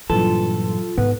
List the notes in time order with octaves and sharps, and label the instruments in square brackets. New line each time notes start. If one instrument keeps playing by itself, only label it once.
[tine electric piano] G2 A#2 E3 [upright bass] F#3 [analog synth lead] F4 [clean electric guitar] A4
[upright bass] G#2 [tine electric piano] B3 [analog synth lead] B4